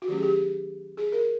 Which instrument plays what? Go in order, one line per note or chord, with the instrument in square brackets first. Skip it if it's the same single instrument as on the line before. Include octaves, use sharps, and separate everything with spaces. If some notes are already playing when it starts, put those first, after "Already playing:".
[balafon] F#4
D#3 F#3 A3 C#4 G4
G#4
G4
G#4
A#4